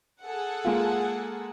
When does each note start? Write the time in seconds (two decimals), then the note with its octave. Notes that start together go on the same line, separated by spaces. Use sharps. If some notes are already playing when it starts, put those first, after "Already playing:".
0.23 G#4 A4 F#5
0.65 G#3 A#3 F4